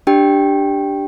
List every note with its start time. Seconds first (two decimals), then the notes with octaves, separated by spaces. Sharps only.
0.07 D4 G4 G5